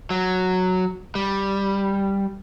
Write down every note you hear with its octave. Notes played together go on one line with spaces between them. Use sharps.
F#3
G3